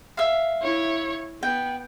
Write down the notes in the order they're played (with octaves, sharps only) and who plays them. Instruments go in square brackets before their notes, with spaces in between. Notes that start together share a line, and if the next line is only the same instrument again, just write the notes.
[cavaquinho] E5 F5
[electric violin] E4 C#5
[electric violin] B3 [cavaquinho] G5